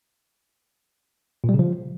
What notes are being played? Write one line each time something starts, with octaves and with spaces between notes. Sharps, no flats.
A#2
G3
C#3
F3